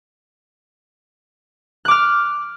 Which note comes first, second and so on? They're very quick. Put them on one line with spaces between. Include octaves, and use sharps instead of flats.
F#6 D6 F6